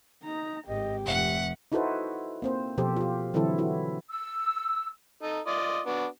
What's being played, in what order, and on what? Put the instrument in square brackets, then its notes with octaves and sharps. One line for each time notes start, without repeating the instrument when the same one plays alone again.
[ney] D#4 [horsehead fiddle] A#5
[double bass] G#1 [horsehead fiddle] G4 [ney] D#5
[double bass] F1 [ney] E5 [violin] F#5
[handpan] D#4 E4 F#4 A4 B4 C5
A#3 C4 C5
B2 F3 G4 A4 C5
F4 G4
D3 E3 F#3 C4 E4 A4
E4 F#4
[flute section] E6
[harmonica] D#4 A4
F4 D5 D#5
B3 D4 F#4